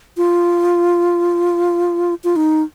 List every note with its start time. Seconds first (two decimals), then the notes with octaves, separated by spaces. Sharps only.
0.17 F4
2.24 F4
2.36 D#4